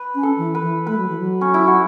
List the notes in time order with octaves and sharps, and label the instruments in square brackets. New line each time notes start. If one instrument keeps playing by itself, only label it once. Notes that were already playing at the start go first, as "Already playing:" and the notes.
Already playing: [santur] B4
[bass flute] C#4
[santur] A4
[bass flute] E3
[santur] B4
[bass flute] E3
[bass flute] A3 [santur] B4
[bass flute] F#3
E3
F#3
[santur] C#4
E4
F#4